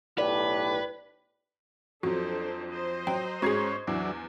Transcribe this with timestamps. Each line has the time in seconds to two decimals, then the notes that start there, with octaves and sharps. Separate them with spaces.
0.18 B1 A2 G4 B4 D5
2.03 F2 F#3 D4 F#4 A4 C5
2.71 C5 D#5
3.07 F#3 G5
3.42 G#2 C#4 F#4 G#4 G#6 C7
3.87 E2 F#3 D4 E4